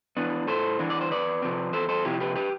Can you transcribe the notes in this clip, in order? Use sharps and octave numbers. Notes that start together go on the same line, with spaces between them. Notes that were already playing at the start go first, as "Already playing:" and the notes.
E3 B3 D4
A2 A4 C5
E3 B3 D4
D5
C5
E2 B4 D5
C3 F3 C4
E2 A4 C5
A4 C5
C3 F3 C4 E4 G4
G4 B4
G4 B4